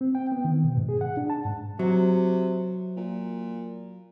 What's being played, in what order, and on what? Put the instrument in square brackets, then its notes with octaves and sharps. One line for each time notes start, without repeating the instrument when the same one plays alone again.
[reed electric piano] C4
G5
B3
D#3
B2
G#2
G#4
F#5
D4
A5
G#2
[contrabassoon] C3 [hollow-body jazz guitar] F#3
[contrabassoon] A#2